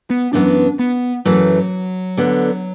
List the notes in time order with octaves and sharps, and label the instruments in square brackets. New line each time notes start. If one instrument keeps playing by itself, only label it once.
[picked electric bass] B3
[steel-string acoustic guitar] F#2 E3 B3 [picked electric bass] D4
[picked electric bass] B3
[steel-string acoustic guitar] F#2 E3 A3 [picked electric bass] F#3
[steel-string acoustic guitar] D2 D3 B3